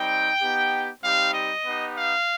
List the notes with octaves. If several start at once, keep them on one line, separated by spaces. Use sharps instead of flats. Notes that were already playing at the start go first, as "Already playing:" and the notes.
Already playing: G3 C4 D#4 G5
B3 D#4 G4
G3 C4 D#4 G4 F5
D#5
B3 D#4 G4
F5